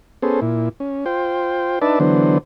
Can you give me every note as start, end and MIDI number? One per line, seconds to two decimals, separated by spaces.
0.22 0.40 59
0.22 0.40 61
0.22 0.40 68
0.22 0.40 69
0.22 0.40 72
0.41 0.69 46
0.41 0.69 64
0.80 1.05 61
1.06 1.79 65
1.06 1.79 72
1.06 1.79 79
1.81 1.99 62
1.81 1.99 63
1.81 1.99 71
1.81 1.99 74
1.81 1.99 76
1.81 1.99 81
2.00 2.38 50
2.00 2.38 52
2.00 2.38 54
2.00 2.38 59
2.00 2.38 62
2.00 2.38 72